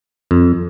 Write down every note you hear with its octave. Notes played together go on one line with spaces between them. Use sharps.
F2